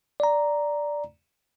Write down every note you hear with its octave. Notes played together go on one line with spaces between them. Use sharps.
D5 A#5